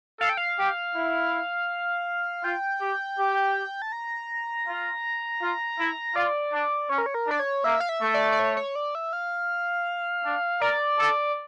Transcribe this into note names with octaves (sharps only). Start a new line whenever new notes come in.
A4 F5
G5
F5
G4
E4
F4 G5
G4
G4
A5
A#5
F4
F4
E4
F4 D5
D4
C#4 C#5
A#4
C#5
A#4
D4 D5
C#5
A#3 E5
F5
E5
A3
D5
D5
C#5
C#5
D5
E5
F5
D4
A#4 D5
A4